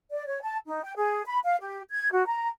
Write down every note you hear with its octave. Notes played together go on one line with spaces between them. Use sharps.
D5
C#5
A5
D#4
G5
G#4
B5
F5
G4
G#6
F#4
A#5